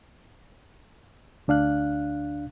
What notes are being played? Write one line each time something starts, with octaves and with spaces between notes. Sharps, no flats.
D2 D4 F5 F#6